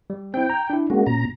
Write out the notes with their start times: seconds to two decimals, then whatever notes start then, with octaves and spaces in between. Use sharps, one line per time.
0.10 G3
0.34 C4 E4 G5
0.50 A#5
0.70 D4 E4
0.90 G#3 A#3 C#4 F#4
1.06 A#2 A#5